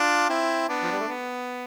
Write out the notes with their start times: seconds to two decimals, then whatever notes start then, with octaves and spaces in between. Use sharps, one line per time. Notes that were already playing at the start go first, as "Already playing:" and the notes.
Already playing: D4 F4
0.29 C4 E4
0.69 B3 D4
0.83 F3
0.92 G3
1.00 A3
1.08 B3